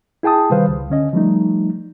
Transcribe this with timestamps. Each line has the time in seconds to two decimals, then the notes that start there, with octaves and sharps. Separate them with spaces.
0.23 E4 G#4 G5 A5 D#6
0.50 C3 D#3 G3 B4 C5 F5
0.69 C#2
0.90 D3 C#4 D#5
1.13 F3 G3 A3 D#4